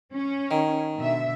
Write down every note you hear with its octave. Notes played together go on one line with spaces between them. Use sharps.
C#4
D#3
B2 D3 E5